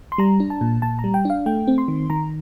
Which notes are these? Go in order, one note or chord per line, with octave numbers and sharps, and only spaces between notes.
C6
G3 A#5
D4
A5
A#2
A#2 A5
A#5
G3
G5
D4 F5
A3 G5
C4
C6
D#3
D#3 A#5